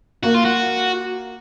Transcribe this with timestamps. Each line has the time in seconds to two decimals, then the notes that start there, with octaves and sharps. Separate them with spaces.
0.23 A#3 F#4
0.34 F4
0.45 F#4